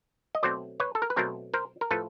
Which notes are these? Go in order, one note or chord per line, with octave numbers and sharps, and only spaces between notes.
D#5
B2 F#3 A3 C4 C5 D5
B4 C#5
A4
A#4
B4
B2 F#3 A3 C4 A#4 C5
A#4 C5
A#4
A2 F3 A3 A4 B4